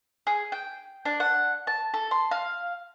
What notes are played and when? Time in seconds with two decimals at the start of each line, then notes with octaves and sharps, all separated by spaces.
0.27 G#4
0.52 G5
1.05 D4
1.20 F#5
1.67 A5
1.94 A4
2.11 C6
2.31 F5